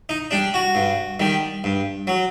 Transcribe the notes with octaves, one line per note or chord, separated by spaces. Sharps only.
D#4
G3 D4
F#4
G2
D#3 G3
G2
F#3